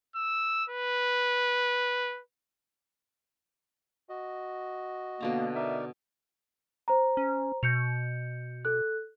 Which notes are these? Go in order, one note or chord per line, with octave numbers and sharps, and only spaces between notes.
E6
B4
F#4 D#5
B2 D3 A#3 A#5
D#4 A#4 D5 E5
C5 A#5
C#4
B2 G6 C#7 F7
A4 F#6